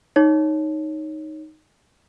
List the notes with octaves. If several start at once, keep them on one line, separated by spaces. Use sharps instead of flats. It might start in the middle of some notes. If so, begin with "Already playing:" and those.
D#4 C#5